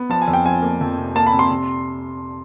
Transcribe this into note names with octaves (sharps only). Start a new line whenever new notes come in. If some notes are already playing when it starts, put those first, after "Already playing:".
Already playing: B3
F3 A5
G#5
F2
G5
F3 G#5
A#3
F2
C3
A#3 A5
B5
C3
C6
C3